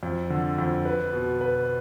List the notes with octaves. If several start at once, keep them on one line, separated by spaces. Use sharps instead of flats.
F2
D3
F2
B4
B2
B4